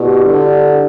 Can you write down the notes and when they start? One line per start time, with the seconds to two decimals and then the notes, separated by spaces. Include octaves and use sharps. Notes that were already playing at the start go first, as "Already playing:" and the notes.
Already playing: B2 E4 G4 D5
0.25 D3